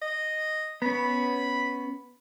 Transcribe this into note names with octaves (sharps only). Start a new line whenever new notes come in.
D#5
B3 C#4 B5